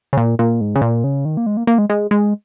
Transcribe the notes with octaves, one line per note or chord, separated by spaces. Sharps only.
C#3
A#2
A#2
G#2
C#3
A#2
C#3
D#3
A#3
G#3
A#3
A#3
G#3
G#3
G#3